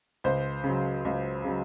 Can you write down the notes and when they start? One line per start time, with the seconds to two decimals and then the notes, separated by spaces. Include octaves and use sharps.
0.24 C#2 C5
0.64 C#3
0.69 F#3
1.05 C#2
1.44 C#3 F#3